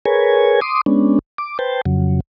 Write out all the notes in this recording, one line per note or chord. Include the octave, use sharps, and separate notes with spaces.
G#4 A#4 B4 C#5 G#5
C6 D6 D#6
G#3 B3 C#4 D4
D6
B4 C5 G5 A5
F2 C#3 F#3